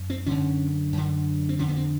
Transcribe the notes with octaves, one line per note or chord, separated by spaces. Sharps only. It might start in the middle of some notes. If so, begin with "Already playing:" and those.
Already playing: F#2
C4
F#2 D3 C#4
F#2 D3
C4
F2 D3 C#4
B3
C4